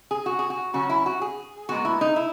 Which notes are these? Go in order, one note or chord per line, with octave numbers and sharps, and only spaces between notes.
G#4
F#4
G#4
F#4
C#3 F#3 C#4 F#4
E4
F#4
G#4
A#2 G#3 B3 F#4
E4
D#4
E4